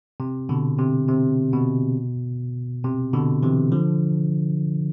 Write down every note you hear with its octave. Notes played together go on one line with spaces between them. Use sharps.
C3
B2 D3
C3
C3
B2
C3
B2 D3
C3 E3
D3 F3